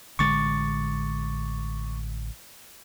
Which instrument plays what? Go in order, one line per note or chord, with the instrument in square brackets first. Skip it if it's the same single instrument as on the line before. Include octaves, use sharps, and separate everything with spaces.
[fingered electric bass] A1 D3 G#3 [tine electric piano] C#6 D6 A6